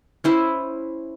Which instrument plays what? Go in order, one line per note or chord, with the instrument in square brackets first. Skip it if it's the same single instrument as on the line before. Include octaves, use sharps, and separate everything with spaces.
[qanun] C#4 E4 C5